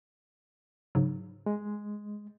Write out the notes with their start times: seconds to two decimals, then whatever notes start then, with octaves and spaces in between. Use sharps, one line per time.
0.95 G#2 C#3 F#3
1.46 G#3